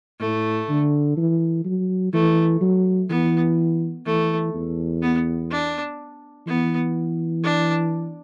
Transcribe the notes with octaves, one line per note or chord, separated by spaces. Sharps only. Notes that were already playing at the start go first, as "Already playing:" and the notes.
A2 A3
D3
E3
F#3
E3 A3
F#3
E3 B3
E3 A3
E2
B3
D4
E3 B3
D4